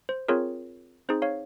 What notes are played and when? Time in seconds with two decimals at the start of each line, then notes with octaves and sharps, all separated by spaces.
0.09 C5
0.28 C4 F4 G#4 A#4 C#5
1.09 C4 D#4 G#4 C5
1.22 C#5 F5